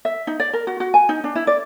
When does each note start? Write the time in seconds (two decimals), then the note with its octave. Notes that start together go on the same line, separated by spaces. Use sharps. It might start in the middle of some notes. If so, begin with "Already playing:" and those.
0.05 E5
0.27 D#4
0.40 D5
0.53 A#4
0.67 F#4
0.80 F#4
0.94 G#5
1.09 D#4
1.24 D4
1.36 E4
1.47 D5